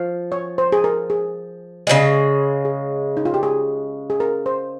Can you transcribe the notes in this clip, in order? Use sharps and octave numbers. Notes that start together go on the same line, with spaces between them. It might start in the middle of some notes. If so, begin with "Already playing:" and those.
Already playing: F3 F5
C#5
C5
G#4
A#4
G#4
C#3 F3 G#3
G#4
D#4
F4
G4
G#4
G#4
A#4
C5